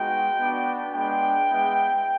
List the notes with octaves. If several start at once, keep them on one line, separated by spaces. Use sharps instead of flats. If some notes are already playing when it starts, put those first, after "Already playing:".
Already playing: G#3 B3 D#4 F#4 G5
B3 D4 F#4
G#3 B3 D4 G5
G#3 B3 E4